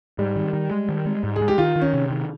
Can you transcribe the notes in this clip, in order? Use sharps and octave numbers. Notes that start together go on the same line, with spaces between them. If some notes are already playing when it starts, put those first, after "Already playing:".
G#2 G3
D#3
D#3
G#3
D#3
G#3
G#2
G#4
G#3
G4
D#3 F4
D#3
C#4
C3
D#3